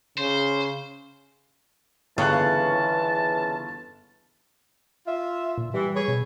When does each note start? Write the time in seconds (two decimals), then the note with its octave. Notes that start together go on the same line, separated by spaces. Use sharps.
0.18 C#3 C5
2.18 G1 C#3 E3 A5 C#6 F#6
5.07 F4 E5
5.58 A#2
5.74 E3 G3
5.95 G#4 B4 C#5
6.08 B2